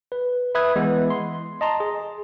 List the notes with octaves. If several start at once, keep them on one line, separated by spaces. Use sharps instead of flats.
B4
B4 E5 B5 D#6 F#6 G#6
E3 G#3 B3 E4
C6
D#5 A5 A#5 C6
G#4